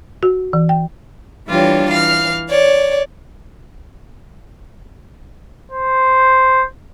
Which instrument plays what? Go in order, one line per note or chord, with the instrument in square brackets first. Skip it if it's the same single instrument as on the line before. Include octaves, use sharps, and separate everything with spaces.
[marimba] F#4
E3
G5
[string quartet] E3 G3 D4 F4 G4 C#5
E3 F5 F6
C#5 D5
[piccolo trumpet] C5